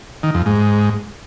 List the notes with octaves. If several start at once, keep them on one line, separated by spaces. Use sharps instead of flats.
D#3
F2
G#2